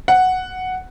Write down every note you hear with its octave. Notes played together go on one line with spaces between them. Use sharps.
F#5